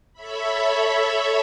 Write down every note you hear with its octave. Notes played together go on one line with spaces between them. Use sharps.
A4 C#5 E5 B5